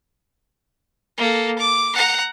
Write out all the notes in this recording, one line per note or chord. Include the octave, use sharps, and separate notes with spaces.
A#3 A4
D6
F#5 A#5